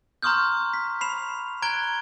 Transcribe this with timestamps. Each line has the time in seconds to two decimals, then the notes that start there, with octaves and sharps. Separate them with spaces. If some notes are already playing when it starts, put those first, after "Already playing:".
0.23 A#5 C6 C#6 D#6 F6 G6
0.74 B6
1.01 B5 C7 E7 F7
1.62 A#5 F#6 G#6 D7 G7